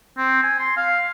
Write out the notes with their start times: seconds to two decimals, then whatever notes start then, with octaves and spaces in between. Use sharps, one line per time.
0.18 C4
0.43 G#5
0.59 C6
0.77 F5